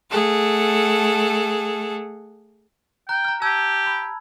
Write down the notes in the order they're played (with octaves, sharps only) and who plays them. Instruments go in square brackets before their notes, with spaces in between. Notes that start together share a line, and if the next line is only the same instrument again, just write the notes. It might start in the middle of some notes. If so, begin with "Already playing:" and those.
[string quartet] A3 G#4 A4 F#5
[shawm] G5 [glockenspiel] A#5 F#6
[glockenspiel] A#5 F6
[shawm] G4 [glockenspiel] A5 E6 G#6
[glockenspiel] B5